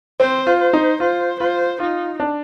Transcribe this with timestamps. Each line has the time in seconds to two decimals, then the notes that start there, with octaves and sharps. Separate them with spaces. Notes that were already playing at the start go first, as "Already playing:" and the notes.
0.20 C4 C5
0.47 F4
0.60 C5
0.73 D#4
1.00 F4 C5
1.40 F4 C5
1.80 D#4 F4
2.20 D4